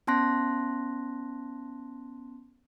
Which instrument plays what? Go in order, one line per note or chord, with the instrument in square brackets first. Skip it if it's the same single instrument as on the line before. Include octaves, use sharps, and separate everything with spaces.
[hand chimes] B3 C#4 A5 C6 F#6 A#6